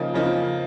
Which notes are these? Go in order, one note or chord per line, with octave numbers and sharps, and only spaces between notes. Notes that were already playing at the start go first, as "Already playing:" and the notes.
Already playing: C#3 F3 A#3 D#4
C#3 F3 A#3 D#4